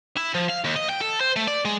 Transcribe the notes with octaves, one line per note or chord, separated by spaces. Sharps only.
E4
F3
F5
D#2
D#5
G5
A4
C5
A3
D5
G#3